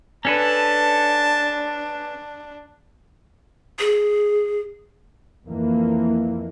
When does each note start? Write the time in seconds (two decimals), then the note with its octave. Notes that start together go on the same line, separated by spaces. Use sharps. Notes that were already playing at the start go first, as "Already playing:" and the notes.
0.25 C#4 D4 A4 B4 A5
3.79 G#4
5.48 F2 E3 A#3